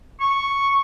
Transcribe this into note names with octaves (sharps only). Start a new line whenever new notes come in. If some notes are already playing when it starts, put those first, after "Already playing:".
C#6